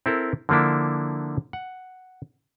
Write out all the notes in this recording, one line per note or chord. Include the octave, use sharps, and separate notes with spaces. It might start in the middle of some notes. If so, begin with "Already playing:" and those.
C4 E4 A4 A#4
D3 F3 A#3 D4 E4
F#5